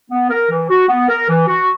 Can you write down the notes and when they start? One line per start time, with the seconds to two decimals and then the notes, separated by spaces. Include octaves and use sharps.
0.11 B3
0.30 A#4
0.50 E3
0.70 F#4
0.89 B3
1.09 A#4
1.29 E3
1.48 F#4